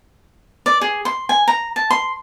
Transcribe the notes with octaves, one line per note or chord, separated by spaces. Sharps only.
D5
G#4
C6
G#5
A#5
A5
C6